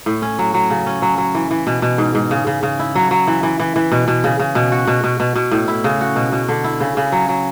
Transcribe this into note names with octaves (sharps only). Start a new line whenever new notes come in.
A2
C#4
F#3
F#3
C#3
C#4
F#3
F#3
E3
E3
B2
B2
G#2
G#2
C#3
C#3
C#3
E4
F#3
F#3
E3
E3
E3
E3
B2
B2
C#3
C#3
B2
F#4
B2
B2
B2
B2
A2
E4
C#3
F#4
B2
B2
D3
E4
C#3
C#3
F#3
F#3